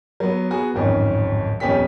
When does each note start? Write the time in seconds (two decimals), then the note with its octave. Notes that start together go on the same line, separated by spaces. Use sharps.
0.20 F#3 B3
0.51 B3 F#4 G#4
0.74 D1 G#1 F2 C#4
1.60 D#1 F2 B3 C#4 G4 B6